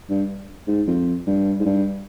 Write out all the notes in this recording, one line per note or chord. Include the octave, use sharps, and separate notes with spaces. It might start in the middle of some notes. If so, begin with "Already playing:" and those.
G2
G#2
F2
G2
G#2
G2